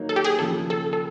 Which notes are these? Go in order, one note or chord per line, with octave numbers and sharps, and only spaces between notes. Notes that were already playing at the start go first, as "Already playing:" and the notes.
Already playing: F#3 A#3 D#4
A4
G4
G#4
D#2 C#3 F3 A4
A4
A4